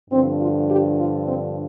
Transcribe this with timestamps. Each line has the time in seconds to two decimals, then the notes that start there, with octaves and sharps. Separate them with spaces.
0.10 G2 D3 F3 C4
0.39 F4
0.68 G4
0.98 F4
1.26 C4